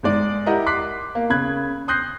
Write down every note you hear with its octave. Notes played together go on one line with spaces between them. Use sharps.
G#2 G#3 D5
E4 G4 A#4 D#5 F#5 A#5
C6 D6 F#6 B6 C7
A#3
C#3 B5 F#6 G#6
C6 D#6 F#6 G6 A#6 C7